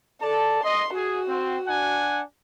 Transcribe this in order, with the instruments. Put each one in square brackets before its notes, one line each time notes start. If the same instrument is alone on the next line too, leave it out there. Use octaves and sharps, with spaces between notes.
[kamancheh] A4 [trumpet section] D5 A5
[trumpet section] D#5 [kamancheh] C6
[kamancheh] F#4 [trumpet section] G#4
[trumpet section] C4
D4 F#5 G#5